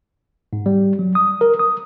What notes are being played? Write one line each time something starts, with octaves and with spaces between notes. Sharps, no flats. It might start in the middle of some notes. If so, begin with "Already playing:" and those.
G#2
G3
F#3
D#6
A#4
D#6